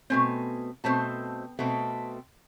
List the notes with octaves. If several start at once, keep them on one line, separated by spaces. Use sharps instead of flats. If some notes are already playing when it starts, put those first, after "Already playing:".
B2 A3 C4 G#5
B2 A3 C4 A5
B2 A3 C4